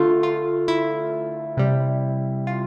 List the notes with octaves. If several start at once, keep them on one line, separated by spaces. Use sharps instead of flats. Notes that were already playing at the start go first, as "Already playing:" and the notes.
Already playing: D3 A3 F4
F4
E4
C3 G3
F4